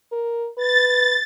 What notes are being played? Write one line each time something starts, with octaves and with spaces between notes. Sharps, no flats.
A#4
B4 A6